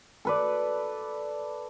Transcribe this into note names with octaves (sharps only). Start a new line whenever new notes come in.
A4 B4 D5